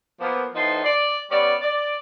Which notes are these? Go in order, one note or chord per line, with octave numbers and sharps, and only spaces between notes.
F3 A#3 B3
A2 F3 B3 D#4 A5 C6
D5
G3 B3 C#4 D5
D5